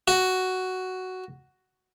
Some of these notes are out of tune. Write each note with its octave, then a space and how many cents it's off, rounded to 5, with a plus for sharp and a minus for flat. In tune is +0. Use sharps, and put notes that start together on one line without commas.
F#4 +5